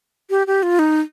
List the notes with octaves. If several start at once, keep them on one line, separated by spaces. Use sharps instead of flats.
G4
G4
F4
D#4